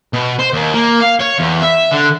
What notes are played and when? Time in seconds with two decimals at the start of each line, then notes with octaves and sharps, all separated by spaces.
0.13 B2
0.39 C5
0.53 D#2
0.73 A#3
1.00 F5
1.20 C#5
1.39 E2
1.62 E5
1.92 D3